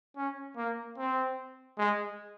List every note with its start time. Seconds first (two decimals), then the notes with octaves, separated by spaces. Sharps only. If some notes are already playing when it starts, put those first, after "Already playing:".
0.16 C#4
0.57 A#3
0.98 C4
1.79 G#3